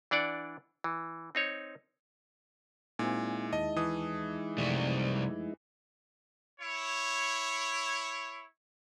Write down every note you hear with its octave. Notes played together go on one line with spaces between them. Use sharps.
E3 D4 D5 F#5
E3
C4 D#4 C#5
A#2 G#3 C4 D#4 E4 G#5
D#2 D#5 A5
E3 D#6
C2 F#2 F3 G3 A3
E4 C#5